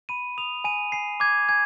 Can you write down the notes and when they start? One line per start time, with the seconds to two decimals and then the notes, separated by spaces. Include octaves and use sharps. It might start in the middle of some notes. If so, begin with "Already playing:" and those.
0.09 B5 D#7
0.38 D#6 F7
0.64 G#5 D#7
0.92 G#5 C7
1.20 D6 G#6
1.49 G#5 G#6